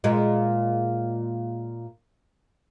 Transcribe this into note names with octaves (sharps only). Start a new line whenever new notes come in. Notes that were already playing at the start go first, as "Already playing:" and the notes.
A#2 G#3